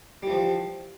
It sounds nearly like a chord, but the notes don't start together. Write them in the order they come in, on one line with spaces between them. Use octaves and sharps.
G3 E3 F3